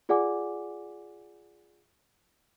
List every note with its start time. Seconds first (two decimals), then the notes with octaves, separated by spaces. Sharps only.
0.09 F4 G#4 D5 F#5 G#5 D6